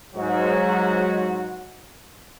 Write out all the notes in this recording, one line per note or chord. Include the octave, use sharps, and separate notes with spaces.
G#2 F#3 F#4